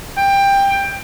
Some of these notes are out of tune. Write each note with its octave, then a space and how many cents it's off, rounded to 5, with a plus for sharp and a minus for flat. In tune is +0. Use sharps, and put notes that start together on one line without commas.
G5 +15